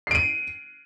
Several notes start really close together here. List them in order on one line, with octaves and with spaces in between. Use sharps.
C7 D7 D#7